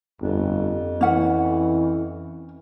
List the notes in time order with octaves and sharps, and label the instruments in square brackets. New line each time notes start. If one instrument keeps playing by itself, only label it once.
[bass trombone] G1 [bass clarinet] F2
[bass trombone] E3 [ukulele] C#4 F#5